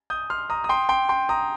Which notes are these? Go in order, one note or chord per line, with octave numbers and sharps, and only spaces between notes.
D#6 G6
C6 F6
A#5 D#6
D#6
G5 C6
G5 C6
G5 C6
A#5 D#6